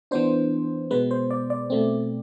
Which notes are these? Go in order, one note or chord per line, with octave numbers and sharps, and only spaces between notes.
E3 B3 D4 C5
B2 G#3 B3 B4
C5
D5
D5
B2 A3 C4